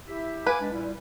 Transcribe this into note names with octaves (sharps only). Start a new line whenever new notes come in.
E4 G4 E5
B4 F5 G#5 D6
G#3 D4
A#2 G3 E4